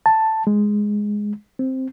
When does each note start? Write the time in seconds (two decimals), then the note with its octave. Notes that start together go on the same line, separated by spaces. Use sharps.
0.06 A5
0.47 G#3
1.59 C4